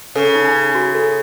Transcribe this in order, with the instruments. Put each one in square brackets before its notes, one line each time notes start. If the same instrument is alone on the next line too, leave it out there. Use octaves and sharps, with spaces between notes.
[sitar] C#3 [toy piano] A4
[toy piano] D#4
D#4
F#4
A4